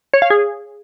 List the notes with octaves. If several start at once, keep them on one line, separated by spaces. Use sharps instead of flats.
C#5
F5
G#4